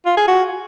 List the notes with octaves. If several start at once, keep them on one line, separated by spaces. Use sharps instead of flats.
F4
G#4
F#4